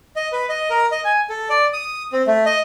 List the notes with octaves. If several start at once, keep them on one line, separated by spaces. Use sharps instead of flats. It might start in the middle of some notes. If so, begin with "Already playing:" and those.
D#5
B4
D#5
A#4
D#5
G#5
A4
D5
D#6
C4
A3
D#5